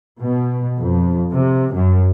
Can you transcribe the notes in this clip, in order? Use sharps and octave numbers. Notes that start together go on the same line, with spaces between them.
B2
F2
C3
F#2